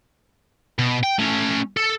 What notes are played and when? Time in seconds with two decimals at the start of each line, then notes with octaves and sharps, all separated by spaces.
0.79 B2
1.03 G5
1.19 A3 C#4
1.77 A4